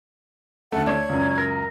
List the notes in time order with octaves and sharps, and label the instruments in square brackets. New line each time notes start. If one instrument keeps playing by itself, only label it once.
[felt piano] D2 A3 [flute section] A4 F#5
[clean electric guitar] D4 C#5 [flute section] G#6
[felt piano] C#2 F#2
[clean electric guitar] A#4